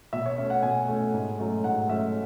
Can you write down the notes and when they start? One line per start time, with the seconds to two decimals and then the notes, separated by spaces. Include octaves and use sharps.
0.13 B2 E5
0.26 C#5
0.38 A3 C#4 E5
0.50 F#5
0.62 B2 G#5
0.88 A3 C#4
1.14 G#2
1.38 F#3 A3 C#4
1.63 G#2 F#5
1.89 F#3 A3 C#4 E5